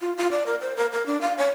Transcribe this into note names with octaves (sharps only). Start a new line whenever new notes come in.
F4
F4
D5
A#4
C5
A#4
A#4
D4
F5
C#5